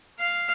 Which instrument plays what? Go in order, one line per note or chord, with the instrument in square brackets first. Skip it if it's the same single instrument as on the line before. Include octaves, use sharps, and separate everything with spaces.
[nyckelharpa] F5